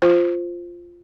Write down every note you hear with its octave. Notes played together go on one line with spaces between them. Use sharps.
F4 C5